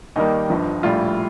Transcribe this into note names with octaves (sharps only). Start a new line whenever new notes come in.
D#2 D#3 G3 A#3 D#4
G1 G2 F3
A#1 A2 G3 F4